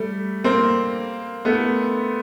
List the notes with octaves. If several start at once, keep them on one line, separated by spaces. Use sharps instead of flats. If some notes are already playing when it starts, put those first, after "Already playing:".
Already playing: G3 A3
A#3 C4
A3 B3